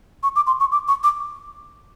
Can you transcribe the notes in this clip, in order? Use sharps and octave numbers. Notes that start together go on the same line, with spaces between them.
C#6
D6
C6
C#6
D6
C#6
D6